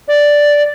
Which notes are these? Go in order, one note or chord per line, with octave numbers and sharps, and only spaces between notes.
D5